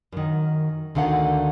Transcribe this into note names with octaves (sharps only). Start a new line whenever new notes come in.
F#2 D#3
D2 D3 D#3 F5 F#5